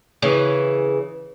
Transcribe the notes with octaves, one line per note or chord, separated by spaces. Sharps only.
C#3 E3